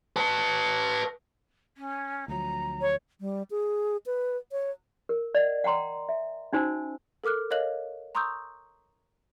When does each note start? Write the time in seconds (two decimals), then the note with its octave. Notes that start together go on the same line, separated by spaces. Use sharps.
0.16 B4 A5
1.77 C#4
2.28 D2 F3 F#3 A#5
2.81 C#5
3.21 G3
3.51 G#4
4.06 B4
4.52 C#5
5.09 A#4
5.35 D5 D#5 F#5
5.64 F#5 G5 A#5 C6
6.09 E5
6.53 C#4 D#4 F#4 C5 G#5 E6
7.24 A4 A#4 D6 F6 F#6
7.51 A#4 C#5 D#5 F5 F#6 F#7
8.15 A#5 C6 C#6 D#6 E6 G6